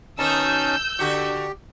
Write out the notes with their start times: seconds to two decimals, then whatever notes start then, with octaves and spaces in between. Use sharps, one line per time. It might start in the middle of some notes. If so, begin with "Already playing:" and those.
0.19 B2 D#3 C#4 D#4 A5 E6 G6
0.99 D3 F#4 G4